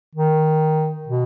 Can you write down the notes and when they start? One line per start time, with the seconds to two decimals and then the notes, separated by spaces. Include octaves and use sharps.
0.15 D#3
1.07 B2